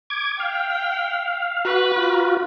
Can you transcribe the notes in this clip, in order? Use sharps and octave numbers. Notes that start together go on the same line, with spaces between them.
D6 G#6
F5 G5
F#4 B4
F4 F#4